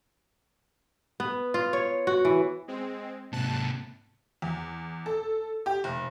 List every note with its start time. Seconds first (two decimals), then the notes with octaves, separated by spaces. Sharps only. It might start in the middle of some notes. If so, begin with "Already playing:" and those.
1.20 B3
1.54 F4
1.73 C#5
2.07 F#4
2.25 E3
2.68 G#3 C4
3.33 G#2 C3 A5 F#6
4.42 E2
5.06 A4
5.66 G4
5.84 F1